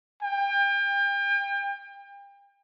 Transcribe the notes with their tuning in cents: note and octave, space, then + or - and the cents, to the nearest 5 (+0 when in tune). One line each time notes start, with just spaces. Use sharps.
G5 +35